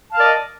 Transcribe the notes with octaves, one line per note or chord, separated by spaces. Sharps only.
A#4 D5 D#5 F5 A5